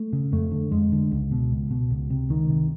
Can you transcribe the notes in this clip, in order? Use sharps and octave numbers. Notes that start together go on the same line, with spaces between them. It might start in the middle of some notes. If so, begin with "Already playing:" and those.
Already playing: A3
C#3
F2 A3
D3
F2 G#3
D3
C#2
B2
C#2
B2
C#2
C3
C#2 D#3
C3